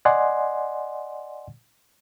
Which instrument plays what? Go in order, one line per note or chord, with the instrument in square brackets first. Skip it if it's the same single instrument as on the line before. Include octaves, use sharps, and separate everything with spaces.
[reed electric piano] D5 D#5 F#5 G#5 C6